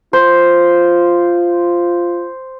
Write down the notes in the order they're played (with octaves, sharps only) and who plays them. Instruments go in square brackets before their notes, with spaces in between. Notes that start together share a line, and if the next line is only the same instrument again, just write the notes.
[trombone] F4 [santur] C5